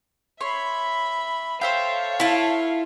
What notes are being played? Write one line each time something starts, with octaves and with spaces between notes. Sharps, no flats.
C#5 E5 B5 C6
A4 C5 C#5 E5 F5 G5
E4 F4 A5